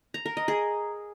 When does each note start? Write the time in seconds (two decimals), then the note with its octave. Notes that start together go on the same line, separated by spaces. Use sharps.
0.14 A#5
0.26 A#4
0.37 D#5
0.48 G#4